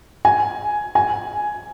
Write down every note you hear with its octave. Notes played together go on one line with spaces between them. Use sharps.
G#5
G#5